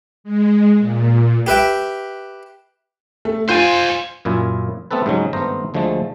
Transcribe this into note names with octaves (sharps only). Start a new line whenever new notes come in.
G#3
A#2
G4 B4 E5 G5
A3
F4 C5 G#5 G6
F#2 A#2 E4 F4 G#5
A3 B3 C4 A4 B4
G#2 C#3 F#3 G#3
G#1 G2 A3 B3 C5 A#5
D2 D3 F3 G#3 A3